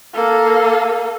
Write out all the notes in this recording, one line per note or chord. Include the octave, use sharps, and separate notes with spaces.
A#3 A4